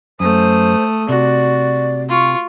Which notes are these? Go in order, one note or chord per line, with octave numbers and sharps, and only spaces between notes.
F#2 A3 C5 D#6
C3 F#4 D5
F4 C#6